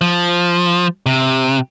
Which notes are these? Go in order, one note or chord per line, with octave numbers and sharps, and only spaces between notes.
F3
C3